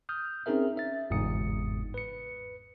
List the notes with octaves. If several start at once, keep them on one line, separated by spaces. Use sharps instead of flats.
D#6 F6 G6
C4 C#4 D#4 G#4 A#4 E5
E5 A6
G1 E2 G#2 C3 D#6 C#7
B4 C#7